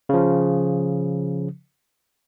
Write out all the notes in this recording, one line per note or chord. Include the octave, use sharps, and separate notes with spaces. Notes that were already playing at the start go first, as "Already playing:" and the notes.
C#3 F3